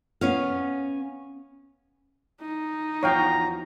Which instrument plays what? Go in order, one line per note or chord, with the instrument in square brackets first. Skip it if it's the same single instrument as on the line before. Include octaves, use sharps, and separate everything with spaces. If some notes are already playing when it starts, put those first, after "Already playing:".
[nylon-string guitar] B3 C#4 F5
[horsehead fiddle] D#4
[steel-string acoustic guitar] E2 F3 F#4 [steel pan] C#5 F5 G5 [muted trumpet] A#5